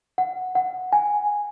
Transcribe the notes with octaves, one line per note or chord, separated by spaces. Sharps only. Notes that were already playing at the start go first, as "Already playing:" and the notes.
F#5
F#5
G#5